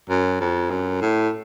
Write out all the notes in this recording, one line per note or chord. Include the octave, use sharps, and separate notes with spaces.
F#2
F2
F#2
A2